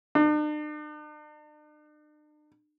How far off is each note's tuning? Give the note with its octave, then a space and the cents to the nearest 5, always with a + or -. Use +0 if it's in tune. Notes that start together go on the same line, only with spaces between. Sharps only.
D4 +45